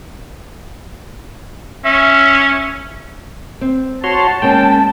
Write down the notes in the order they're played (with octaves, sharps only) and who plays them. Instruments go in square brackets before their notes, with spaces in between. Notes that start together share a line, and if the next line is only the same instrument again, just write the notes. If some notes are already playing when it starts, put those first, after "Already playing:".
[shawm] C#4 [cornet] E5
[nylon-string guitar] C4
[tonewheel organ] F#4 C#5 C6 [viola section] A5
[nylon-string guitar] G#3 A#3 C#4 [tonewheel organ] G5